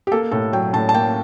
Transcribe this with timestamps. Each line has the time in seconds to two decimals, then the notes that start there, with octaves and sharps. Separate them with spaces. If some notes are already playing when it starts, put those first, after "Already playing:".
0.07 G4
0.12 A#3 A4
0.31 A2 A4
0.52 F#3 G5
0.73 A2 A5
0.89 A5
0.94 A#3 G5